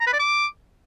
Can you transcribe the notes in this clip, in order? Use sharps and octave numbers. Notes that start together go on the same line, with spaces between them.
A#5
B4
D5
D6